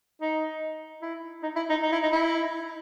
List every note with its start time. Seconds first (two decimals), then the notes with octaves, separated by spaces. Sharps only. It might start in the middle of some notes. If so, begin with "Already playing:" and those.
0.21 D#4
1.02 E4
1.43 D#4
1.56 E4
1.69 D#4
1.83 D#4
1.92 E4
2.03 D#4
2.13 E4